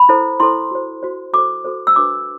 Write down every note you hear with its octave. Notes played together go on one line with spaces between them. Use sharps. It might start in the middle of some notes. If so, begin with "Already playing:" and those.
Already playing: B5
E4 A4 C5
E4 A4 C5 C6
F#4 C5
F#4 C5
F#4 A4 C5 D6
F#4 A4 C5
E6
D4 F#4 B4 D6